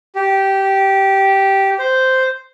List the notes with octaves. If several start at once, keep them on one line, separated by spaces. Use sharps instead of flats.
G4
C5